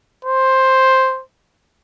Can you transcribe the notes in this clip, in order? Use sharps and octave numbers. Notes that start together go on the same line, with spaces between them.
C5